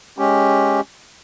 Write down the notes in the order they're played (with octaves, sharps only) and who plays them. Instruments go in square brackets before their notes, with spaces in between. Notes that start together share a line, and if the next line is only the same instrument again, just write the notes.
[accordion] G#3 C#4 G4